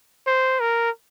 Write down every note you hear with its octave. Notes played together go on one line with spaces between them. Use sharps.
C5
A#4